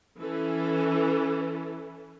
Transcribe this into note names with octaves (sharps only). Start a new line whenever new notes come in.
E3 C#4 A4